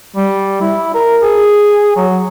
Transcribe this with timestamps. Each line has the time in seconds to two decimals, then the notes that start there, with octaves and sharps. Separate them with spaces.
0.16 G3
0.61 E4
0.94 A#4
1.22 G#4
1.96 F#3